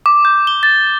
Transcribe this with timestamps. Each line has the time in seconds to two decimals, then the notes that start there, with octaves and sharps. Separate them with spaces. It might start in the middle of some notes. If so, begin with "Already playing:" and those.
0.06 D6
0.25 G6
0.47 G7
0.63 A6